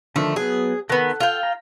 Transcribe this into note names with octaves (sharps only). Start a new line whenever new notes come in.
D3 D#3 F3 A3
F#3 B3 G#4
D#3 B3 A4 F#5
F4 G5
A#5